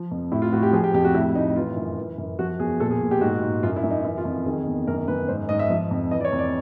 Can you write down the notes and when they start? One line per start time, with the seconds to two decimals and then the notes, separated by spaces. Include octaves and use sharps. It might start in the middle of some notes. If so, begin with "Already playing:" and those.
Already playing: F3
0.11 F2
0.32 A2 E4
0.42 F4
0.52 A2 F#4
0.63 G4
0.73 F3 G#4
0.84 G4
0.94 F2 G4
1.05 F#4
1.14 A2 E4
1.35 A2 D#4
1.56 E3 F4
1.76 F#2
1.97 E3
2.18 F#2
2.39 F3 F#4
2.59 E2 G#4
2.80 A#2 A4
2.91 G#4
3.01 A#2
3.11 G4
3.21 G#2 F#4
3.42 G#2
3.63 F#2 F4
3.76 E4
3.84 F#2
3.91 D#4
4.04 E3 E4
4.18 F4
4.25 F2
4.46 D#3 G#4
4.67 E2
4.87 F#2 A#4
5.08 F#2 B4
5.28 G#2 C5
5.49 G#2 D#5
5.59 E5
5.70 F3
5.91 F2
6.11 E3 D#5
6.20 D5
6.25 C#5
6.32 F2
6.39 D5